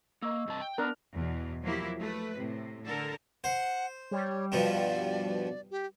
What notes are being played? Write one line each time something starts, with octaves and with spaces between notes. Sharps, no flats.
A#3 D#5 C#6 E6
G2 C3 A5
G5
B3 D4 A#4 D5 F#6
E2 B2
F3 F#3 A#3 E4 G4
A3 B4
A2 C3
D3 A4 A#4
C5 F#5
G3 C#5
G2 B2 F3 D5
G4